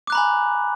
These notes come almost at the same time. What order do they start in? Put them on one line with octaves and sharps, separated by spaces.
D6 F#6 A#5 B5 G#5